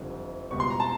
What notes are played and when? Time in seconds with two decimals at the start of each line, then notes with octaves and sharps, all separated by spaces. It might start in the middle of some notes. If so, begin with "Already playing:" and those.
Already playing: F#1 F2 D3 G3
0.51 C#2 B2 G3 C#6
0.60 C6
0.70 A#5
0.80 A5